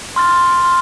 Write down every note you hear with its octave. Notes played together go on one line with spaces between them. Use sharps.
C6 F6 A6
C6 F6